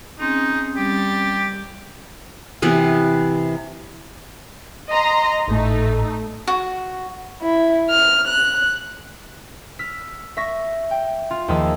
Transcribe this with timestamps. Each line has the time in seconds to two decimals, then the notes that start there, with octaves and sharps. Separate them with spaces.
0.20 C4 C#4 D#4 G#4
0.77 G3 G4 A6
2.62 C3 E3 B3 B4
4.91 D#5 A#5 C6
5.48 G#1 A2 A3 D#4
6.48 F#4
7.41 E4
7.90 F6
8.27 F#6
9.79 E6 F6 B6
10.37 E5 C#6 A#6
10.91 G5
11.31 F4
11.48 D#2 F3 G#4 A5 E6